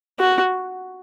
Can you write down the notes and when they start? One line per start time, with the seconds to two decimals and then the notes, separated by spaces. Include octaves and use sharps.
0.19 F#4